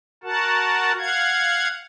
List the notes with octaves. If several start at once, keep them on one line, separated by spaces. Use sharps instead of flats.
F#4 A#4 F#5 A5
F5 F#5 G#6